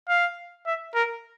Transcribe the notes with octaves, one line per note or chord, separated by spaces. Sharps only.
F5
E5
A#4